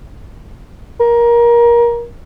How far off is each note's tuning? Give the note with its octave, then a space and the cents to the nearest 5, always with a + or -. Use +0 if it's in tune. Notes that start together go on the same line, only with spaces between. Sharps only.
A#4 +20